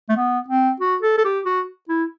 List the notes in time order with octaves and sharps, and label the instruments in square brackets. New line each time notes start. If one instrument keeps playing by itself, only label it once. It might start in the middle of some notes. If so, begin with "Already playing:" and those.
[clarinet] A3
B3
C4
F#4
A4
A4
G4
F#4
E4